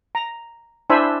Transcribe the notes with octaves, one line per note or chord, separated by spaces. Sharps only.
A#5
D4 E4 C5 E5 G#5 B5